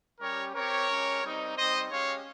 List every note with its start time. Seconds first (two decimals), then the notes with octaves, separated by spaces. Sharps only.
0.21 G3 C#4 G4 A#4 C#5
0.55 C4 G4 A#4 C#5
0.89 G#3 C#4 G4
1.23 G3 C4 D#4
1.57 G3 C4 D#4 C5 D#5
1.91 G#3 C#4 G4 C#5 F5